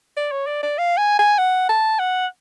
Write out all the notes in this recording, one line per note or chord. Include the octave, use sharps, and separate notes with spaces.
D5
C#5
D5
D5
F5
G#5
G#5
F#5
A5
F#5